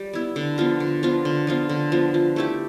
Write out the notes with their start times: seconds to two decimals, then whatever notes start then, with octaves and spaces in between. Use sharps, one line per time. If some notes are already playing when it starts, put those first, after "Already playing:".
Already playing: G3
0.13 B3 E4
0.36 D3
0.58 F3 B3 F4
0.80 D3
1.03 F3 B3 F4
1.25 D3
1.47 F3 B3 F4
1.69 D3
1.92 F3 B3 F4
2.14 F3
2.36 A3 E4 G4